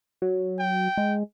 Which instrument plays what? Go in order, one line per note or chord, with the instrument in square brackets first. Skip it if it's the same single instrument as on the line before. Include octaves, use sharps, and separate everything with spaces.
[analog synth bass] F#3
[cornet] G5
[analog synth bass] G#3